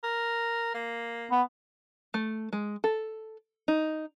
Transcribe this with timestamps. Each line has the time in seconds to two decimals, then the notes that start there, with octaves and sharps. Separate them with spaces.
0.04 A#4
0.74 A#3
1.31 B3
2.14 A3
2.53 G#3
2.84 A4
3.68 D#4